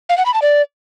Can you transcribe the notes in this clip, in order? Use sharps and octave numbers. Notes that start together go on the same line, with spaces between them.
F5
F#5
B5
A5
D5